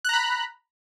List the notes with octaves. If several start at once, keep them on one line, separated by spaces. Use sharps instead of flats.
A#5 B5 F#6